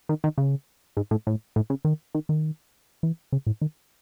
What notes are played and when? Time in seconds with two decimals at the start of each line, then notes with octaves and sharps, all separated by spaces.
0.09 D#3
0.24 D#3
0.38 C#3
0.97 G#2
1.11 A2
1.27 A2
1.56 A2
1.70 C#3
1.85 D#3
2.15 D#3
2.29 D#3
3.03 E3
3.32 C#3
3.47 A2
3.61 D#3